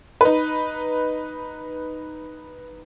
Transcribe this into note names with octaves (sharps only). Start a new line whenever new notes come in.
D#4 B4